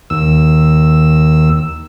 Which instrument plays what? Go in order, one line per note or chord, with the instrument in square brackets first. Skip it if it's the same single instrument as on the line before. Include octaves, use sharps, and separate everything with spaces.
[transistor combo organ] D#2 E6